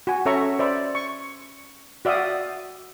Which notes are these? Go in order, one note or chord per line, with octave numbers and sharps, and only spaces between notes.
F#4 G#5
C#4 A4 C#5 E5 A#5 C#6
C5 D5 E5 B5
C#6
F#4 D5 E5 F5 G5 D#6